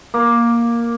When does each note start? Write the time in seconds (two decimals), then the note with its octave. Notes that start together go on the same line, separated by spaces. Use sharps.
0.14 A#3